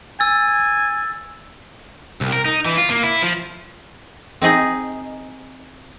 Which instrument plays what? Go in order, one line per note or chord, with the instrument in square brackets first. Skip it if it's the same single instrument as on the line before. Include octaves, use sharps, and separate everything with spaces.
[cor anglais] G#5 [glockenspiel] E6 A6
[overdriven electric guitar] C2
A#4
D#4
E3
F4
A#3
E4
F3
[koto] C4 D#4 G#4 D#5